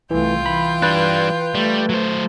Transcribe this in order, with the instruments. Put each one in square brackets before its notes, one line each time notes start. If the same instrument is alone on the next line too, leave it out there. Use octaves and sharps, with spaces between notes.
[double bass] C2 A3 [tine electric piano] E3 [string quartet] F4 G5
[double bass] E3 [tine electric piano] B5
[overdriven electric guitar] G3 D4 [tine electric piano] B4 F#6
[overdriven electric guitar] G3 [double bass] A3
[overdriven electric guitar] F#3 C5